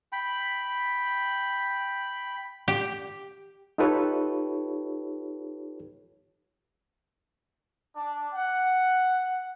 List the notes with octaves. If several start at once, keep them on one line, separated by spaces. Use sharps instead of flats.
G5 B5
G4
D#4 F4 G4 A4 B4 C#5
D4
F#5